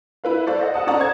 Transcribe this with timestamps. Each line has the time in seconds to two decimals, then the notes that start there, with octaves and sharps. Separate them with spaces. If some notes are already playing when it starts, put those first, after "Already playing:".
0.24 E4 B4 F5
0.46 A4 C5 D5 F5
0.59 C5 D#5 F#5
0.74 A4 F#5 A5 D#6
0.87 C#4 D#4 A4 D5 F#5 A#5
0.99 C5 A5 G#6